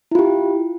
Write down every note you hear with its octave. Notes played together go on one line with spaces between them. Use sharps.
E4 F4 G4